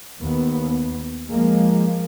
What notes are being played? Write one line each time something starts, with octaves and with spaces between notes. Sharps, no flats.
D#2 B3
F3 G#3 A#3